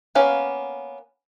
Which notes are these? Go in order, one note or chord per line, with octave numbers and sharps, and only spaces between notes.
A#3 B3 C#4 F5